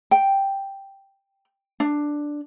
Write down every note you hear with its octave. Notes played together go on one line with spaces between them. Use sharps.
G5
D4